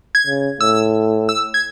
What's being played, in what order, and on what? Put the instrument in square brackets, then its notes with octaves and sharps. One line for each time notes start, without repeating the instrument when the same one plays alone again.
[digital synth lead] G#6
[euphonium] C#3
[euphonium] A2 [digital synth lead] E6
[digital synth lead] E6
G#6